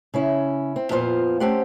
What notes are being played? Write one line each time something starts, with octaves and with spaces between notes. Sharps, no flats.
C#3 C#4 E4
C4
F2 A#2 B3 F4 C5
A3 C4 C#4 G4 C5 F#5